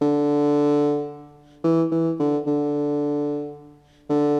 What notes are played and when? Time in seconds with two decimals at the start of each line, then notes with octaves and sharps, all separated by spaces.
0.01 D3
1.64 E3
1.92 E3
2.20 D3
2.47 D3
4.10 D3